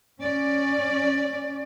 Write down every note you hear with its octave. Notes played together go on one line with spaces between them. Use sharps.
C#4 D5